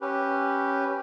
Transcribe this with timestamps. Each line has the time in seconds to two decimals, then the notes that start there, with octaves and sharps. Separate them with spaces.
0.01 C#4 G4 B4